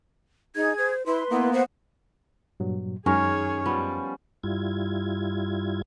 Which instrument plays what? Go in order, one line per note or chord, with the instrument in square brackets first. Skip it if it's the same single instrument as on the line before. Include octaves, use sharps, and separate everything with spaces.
[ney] D#4 [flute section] G#4 G#6
[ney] C5
[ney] E4 [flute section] B4 C6
[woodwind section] A#3 B3 [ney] E4
[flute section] B4 C5 [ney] F#5
[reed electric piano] G2 A#2 F#3
[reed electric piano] F#2 G#5 F6 [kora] D#3 G#3 [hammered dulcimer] C#4 [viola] G#4 C#5
[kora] F3 B3 [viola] G3
[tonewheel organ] G2 G3 E4 F4 G#6